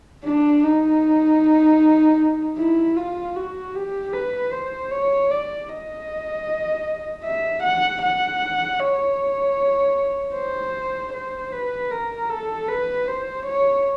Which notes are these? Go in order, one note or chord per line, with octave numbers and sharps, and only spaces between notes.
D4
D#4
E4
F4
F#4
G4
B4
C5
C#5
D5
D#5
E5
F#5
F#5
C#5
C5
C5
B4
A#4
A4
B4
C5
C#5